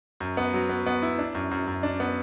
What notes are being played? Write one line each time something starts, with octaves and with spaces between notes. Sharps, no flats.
F#2
B3
F#3
B3
B3
E4
D4
F#2
F#2
F#2
D4
B3